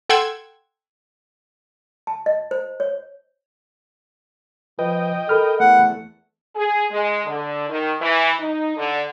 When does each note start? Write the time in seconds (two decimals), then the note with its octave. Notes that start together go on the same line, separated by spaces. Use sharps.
0.09 A4 F#5 G5 C6 E6 G#6
2.07 A5
2.26 D#5
2.51 C5
2.80 C#5
4.79 F3 B4 D#5 G5
5.29 A4 A#4 B5 F6
5.60 E2 A3 F#5
6.56 G#4
6.91 G#3
7.26 D3
7.69 D#3
8.01 E3
8.40 D#4
8.77 D3